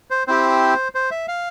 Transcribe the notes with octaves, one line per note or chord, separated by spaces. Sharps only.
C5
C4 E4 G4 C5
C5
E5
F5